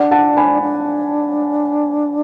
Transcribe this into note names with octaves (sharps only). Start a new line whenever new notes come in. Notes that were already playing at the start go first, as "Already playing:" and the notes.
Already playing: D4 D5 F#5
F#5 A5
G#5 B5
D4